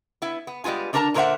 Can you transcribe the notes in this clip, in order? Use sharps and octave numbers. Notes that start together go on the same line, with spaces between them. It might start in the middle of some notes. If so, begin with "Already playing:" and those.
B3 E4
B3
G3 G#3 B3 F4 G#5
D3 D4 A#4 C5 A5 A#5
A#2 D3 A#4 C5 E5 F#5